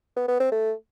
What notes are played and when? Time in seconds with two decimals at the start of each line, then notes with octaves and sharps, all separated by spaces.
0.17 B3
0.28 B3
0.40 C4
0.52 A3